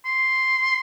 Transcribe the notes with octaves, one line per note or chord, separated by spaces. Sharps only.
C6